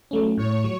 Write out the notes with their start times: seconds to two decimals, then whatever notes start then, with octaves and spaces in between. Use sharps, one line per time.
0.11 F#3 A3 C#4
0.37 A2 C#5
0.64 F#3